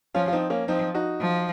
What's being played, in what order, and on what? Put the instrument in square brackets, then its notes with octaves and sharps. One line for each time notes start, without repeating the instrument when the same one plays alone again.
[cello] F3 [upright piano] C#4 F4
[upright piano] F4
C4 D#4
A#3 C#4
[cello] F3 [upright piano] C4 D#4
[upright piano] D#4 F#4
[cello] F3